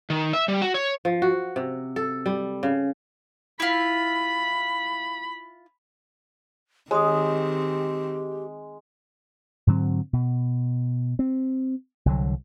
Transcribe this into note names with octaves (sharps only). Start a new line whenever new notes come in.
D#3
E5
G3
F#4
C#5
F3
F#4
C3
A4
G3
C#3
E4 F4 B5
D#3 G#3 C4 G4 C#5 C6 D#6
G#2 D3 F#3 C4
B2
C4
C2 D3 F#3